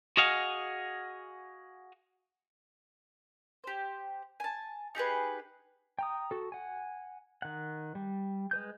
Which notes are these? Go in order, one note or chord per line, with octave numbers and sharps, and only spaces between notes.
F#4 G#4 D#5 F5 F#5 G#5
G4 C5
G#5 A5
D#4 G4 G#4 B4
G5 A#5 D#6
F#4 A4
F#5 G#5
D#3 F#5
G3
G#3 B4 G6